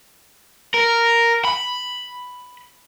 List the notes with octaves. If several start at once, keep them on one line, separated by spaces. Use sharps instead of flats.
A#4
B5